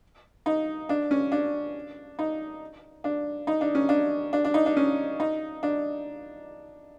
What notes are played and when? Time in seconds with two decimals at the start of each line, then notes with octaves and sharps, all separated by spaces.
0.46 D#4
0.89 D4
1.11 C#4
1.32 D4
2.19 D#4
3.04 D4
3.47 D#4
3.61 D4
3.75 C#4
3.89 D4
4.33 D4
4.45 D4
4.54 D#4
4.66 D4
4.77 C#4
5.20 D#4
5.63 D4